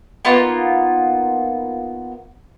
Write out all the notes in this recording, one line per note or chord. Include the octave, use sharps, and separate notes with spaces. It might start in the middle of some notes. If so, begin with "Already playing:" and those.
A#3 B3 D#4 F4